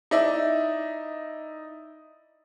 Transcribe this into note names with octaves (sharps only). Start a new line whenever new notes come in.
D#4 E4 D5 E5